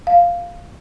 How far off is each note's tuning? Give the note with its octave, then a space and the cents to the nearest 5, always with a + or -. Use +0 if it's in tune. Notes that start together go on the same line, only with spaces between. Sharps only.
F5 +0